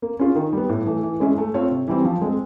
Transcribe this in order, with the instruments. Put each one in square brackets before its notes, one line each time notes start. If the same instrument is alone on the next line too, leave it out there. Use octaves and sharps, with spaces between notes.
[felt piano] A#3
C#4 F4 G#4
D#3
G3 B3
A2
E3 A3
E3
G#3 C#4 E4 G#4
A3
C4 F4 A4 C#5
C3
E3 G3 C4
F3
G#3 C4